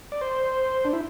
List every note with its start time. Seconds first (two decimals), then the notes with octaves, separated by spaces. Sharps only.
0.12 D5
0.21 C5
0.85 D4
0.93 E4